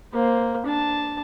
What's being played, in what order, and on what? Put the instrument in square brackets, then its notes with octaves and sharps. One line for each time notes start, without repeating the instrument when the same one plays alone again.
[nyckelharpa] A#3 C5
D4 A5